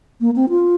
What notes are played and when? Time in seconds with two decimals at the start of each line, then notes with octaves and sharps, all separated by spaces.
0.21 A#3
0.36 C4
0.49 F4